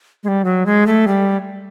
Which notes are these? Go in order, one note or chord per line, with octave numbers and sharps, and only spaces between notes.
G#3
G3
F#3
G#3
A3
G3